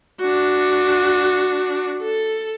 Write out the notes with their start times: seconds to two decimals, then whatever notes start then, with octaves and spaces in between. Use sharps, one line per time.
0.20 D4 F#4
2.02 A4